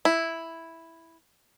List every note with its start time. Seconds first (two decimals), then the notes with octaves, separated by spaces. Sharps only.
0.05 E4